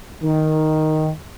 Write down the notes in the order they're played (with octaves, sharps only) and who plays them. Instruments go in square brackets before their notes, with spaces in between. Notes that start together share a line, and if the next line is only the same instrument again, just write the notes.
[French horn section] D#3